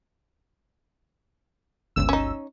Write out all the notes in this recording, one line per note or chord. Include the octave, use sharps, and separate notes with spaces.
G1 C#2 E6
C#4 D#4